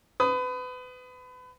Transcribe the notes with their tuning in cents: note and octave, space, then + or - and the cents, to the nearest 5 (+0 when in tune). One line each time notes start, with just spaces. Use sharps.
B4 +30 D#6 +0